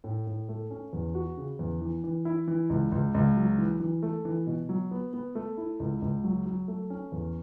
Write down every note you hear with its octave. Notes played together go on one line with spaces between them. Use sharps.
A2
A2
A3
C#4
E2
F#4
C#3
E2
E3
E3
E4
E3
C#2
C#2
C#2
F#3
E3
E3
A3
E3
B2
F#3
B3
B3
A3
E4
C#2
C#2
F#3
F#3
A3
C#4
E2